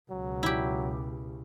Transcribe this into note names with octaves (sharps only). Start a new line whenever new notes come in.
C#2 B2 F#3
E4 G4